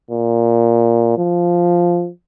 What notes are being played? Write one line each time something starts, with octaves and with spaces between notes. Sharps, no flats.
A#2
F3